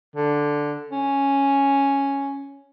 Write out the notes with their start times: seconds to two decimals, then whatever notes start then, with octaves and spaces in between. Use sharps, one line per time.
0.16 D3
0.91 C#4